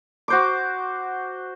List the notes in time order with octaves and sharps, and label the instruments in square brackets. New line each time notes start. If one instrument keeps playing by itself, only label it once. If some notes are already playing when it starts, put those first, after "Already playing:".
[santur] F#4 C5 D6